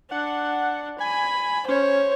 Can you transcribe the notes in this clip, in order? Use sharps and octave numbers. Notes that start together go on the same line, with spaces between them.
D4 F#5
G#5 B5
C#4 C5 C#5